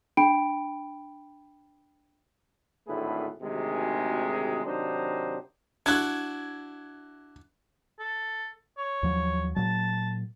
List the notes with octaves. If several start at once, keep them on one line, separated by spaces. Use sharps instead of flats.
D4 G5 B5 D7
G#1 A2 D3 A3 G#4 B4
G#1 D2 C3 D#3 G#3
C3 D#3 F#3 D4 D#4 C5
D4 E4 F#4 F#6 G#6
A4
C#5
D#2 F3 F#3
A#2 F#3 A5